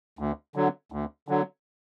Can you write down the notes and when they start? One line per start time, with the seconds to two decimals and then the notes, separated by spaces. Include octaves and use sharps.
0.19 D2
0.55 D3 F#3
0.92 D2
1.28 D3 F#3